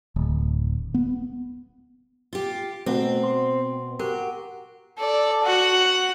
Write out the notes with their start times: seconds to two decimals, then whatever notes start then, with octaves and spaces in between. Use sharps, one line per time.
0.16 D1
0.94 B3
2.33 F4 G4
2.86 B2 A3 C4 F#5
3.23 C6
3.99 F#4 G4 A#4
4.98 A4 D5
5.44 F#4 F#5